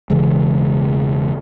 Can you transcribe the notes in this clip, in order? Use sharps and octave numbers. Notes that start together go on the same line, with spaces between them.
E1 C#3 E3 G#3